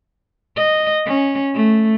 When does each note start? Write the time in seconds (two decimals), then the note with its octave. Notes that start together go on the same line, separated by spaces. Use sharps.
0.56 D#5
1.06 C#4
1.55 A3